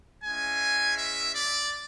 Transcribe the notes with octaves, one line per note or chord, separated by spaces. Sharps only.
G#3 C#4 E4 G#5
E5
D5